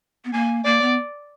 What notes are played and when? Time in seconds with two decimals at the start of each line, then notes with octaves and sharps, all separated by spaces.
0.25 B3
0.33 A#3 G#5
0.65 A#3 D5
0.82 B3